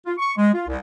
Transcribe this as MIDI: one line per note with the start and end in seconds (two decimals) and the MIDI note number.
0.06 0.13 65
0.18 0.32 85
0.37 0.49 56
0.54 0.64 65
0.67 0.77 36